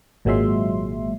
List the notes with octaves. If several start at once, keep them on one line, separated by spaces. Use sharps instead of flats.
G#1 A#2 F#3 G#3 E5 C6